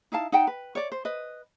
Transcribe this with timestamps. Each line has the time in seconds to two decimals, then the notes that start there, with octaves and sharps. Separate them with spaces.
0.12 D#4 E4 F5 A5
0.32 D#4 F#5 G5 A5
0.47 B4
0.75 C#5 D5
0.92 C5
1.05 B4 D#5